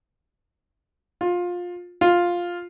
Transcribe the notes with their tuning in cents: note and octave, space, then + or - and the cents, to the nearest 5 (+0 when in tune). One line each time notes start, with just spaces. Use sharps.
F4 +20
F4 +5